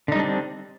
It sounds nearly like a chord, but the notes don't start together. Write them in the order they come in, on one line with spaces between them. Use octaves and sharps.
D3 D#4 G3 D4 C4